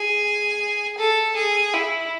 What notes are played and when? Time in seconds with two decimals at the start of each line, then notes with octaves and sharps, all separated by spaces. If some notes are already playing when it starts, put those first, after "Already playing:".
Already playing: G#4
0.98 A4
1.36 G#4
1.74 E4